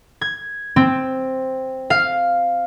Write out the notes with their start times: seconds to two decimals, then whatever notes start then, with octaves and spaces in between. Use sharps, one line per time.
0.21 G#6
0.76 C4
1.90 F5